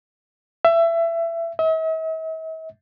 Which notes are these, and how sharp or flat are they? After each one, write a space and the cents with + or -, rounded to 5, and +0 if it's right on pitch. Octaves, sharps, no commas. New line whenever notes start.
E5 +25
E5 -45